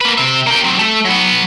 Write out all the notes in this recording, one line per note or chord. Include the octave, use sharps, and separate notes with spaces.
A#3 B4
C3 E5
A#3 G5
F#3 C4
A3
F#3 B3